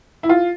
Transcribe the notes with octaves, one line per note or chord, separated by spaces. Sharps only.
E4
F4